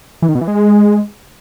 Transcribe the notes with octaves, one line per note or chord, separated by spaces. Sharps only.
E3
D#3
B2
E3
G#3